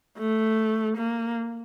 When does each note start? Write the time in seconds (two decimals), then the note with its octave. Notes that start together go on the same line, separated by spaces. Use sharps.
0.18 A3
0.98 A#3